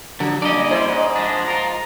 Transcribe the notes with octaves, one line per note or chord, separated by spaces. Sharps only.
D3 F3
G3 A#3 C#4 D4 D5 D#5
G#3 E4 C5
G#2
F3 G#3 D4
F4 A#4